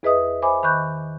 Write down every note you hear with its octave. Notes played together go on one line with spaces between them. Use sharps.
E2 G#4 B4 D#5 E5 D#6
C5 E5 G#5 B5 D6
D#3 B5 C#6 F#6 G6